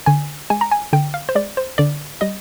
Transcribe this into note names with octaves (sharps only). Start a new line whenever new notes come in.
D3 G#5
G#3 G#5
A#5
G#5
D3 G5
F5
C5
G#3 D5
C5
D3 D5
G3 D#5